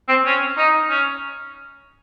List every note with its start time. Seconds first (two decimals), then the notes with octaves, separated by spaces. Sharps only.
0.09 C4
0.25 C#4
0.58 D#4
0.90 C#4